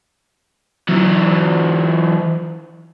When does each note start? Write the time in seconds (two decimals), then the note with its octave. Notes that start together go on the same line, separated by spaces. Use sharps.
0.89 E3 F#3